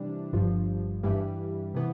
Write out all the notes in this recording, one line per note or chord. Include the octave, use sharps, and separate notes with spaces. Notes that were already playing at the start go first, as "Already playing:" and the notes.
Already playing: C3 E3 G3 D4
G1 G2 F3
G2 E3 G3
C3 E3 B3